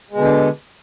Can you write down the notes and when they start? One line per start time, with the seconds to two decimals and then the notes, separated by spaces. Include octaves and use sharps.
0.11 G#3
0.14 B2
0.17 D3